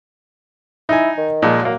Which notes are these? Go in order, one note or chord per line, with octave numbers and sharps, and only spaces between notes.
D#4 E4 G#5
D#3
A#2 F3 G#3
F#3 A#3